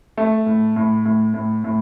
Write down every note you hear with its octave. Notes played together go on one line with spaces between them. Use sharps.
A3
A2
A2
A2
A2
A2